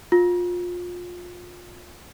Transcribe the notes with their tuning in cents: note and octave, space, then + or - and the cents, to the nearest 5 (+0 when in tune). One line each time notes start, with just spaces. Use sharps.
F4 +25